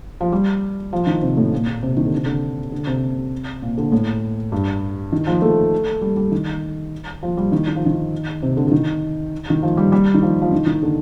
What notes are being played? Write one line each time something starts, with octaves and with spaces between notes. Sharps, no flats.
F3
G3
F3
D#3
C3
A2
A#2
A#2
C3
D#3
D3
C3
D3
D3
C3
A#2
D3
A2
G2
D#3
F3
A3
G3
G3
D#3
F3
G3
D#3
D#3
F3
D#3
C3
D3
D3
D#3
D#3
F3
G3
G3
D#3
F3
F3
D#3
D#3
D3